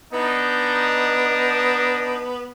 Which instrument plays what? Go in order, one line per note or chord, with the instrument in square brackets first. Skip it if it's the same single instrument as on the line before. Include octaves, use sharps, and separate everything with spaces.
[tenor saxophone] B3 [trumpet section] D4 D#4